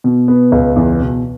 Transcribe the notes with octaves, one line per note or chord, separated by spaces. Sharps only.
B2
B3
C#2
E2
B2